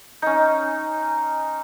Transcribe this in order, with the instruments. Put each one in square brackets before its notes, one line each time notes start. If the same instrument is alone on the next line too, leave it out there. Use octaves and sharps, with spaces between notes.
[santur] C#4 D#4